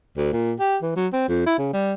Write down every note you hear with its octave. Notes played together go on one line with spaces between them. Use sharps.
D2
A#2
G4
E3
F#3
C4
F2
E4
C#3
G3